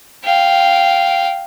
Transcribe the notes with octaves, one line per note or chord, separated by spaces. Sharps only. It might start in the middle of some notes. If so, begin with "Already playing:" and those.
F5 G5